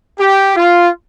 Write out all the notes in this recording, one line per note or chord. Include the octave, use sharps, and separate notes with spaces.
G4
F4